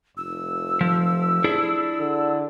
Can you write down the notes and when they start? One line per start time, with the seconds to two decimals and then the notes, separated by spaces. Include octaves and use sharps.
0.17 F1 E6
0.81 F3
1.44 D4 E4 G#4
2.00 D3